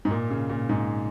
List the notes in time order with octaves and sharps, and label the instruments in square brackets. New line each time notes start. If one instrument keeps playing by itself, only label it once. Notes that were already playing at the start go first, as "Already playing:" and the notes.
[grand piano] G#2
A#2
C#3
A#2
G#2